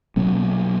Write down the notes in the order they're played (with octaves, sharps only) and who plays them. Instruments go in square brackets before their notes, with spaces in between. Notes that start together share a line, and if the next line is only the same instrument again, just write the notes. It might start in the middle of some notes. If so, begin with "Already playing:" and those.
[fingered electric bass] B2 F#3 A#3 C#4